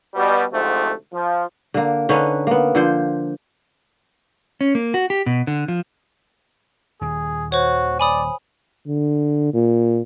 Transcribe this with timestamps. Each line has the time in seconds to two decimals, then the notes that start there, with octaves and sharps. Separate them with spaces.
0.14 B2 G3
0.53 D2 G#2 C3 F3 A3
1.13 F3
1.74 D3 A#3
2.09 D3 C#4 D#4 B4
2.47 A#3 B3
2.75 D3 F3 C5
4.61 C#4
4.75 A#3
4.94 F#4
5.10 G4
5.26 B2
5.47 D3
5.68 F3
7.01 D#1 D#2 G#4
7.52 F#4 C5 C#5
7.99 D5 G#5 B5 D#6
8.88 D3
9.54 A#2